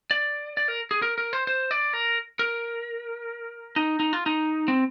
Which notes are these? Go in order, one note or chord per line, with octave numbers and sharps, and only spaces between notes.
D5
D5
A#4
G#4
A#4
A#4
C5
C5
D5
A#4
A#4
D#4
D#4
F4
D#4
C4